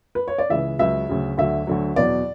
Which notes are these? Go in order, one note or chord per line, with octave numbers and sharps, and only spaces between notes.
B4
C#5
D5
C#2 C#3 E3 E5
C#2 C#3 F#3 E5
D2 C#3 F#3
D2 D3 F#3 E5
D2 D3 F#3
E2 B2 F#3 D5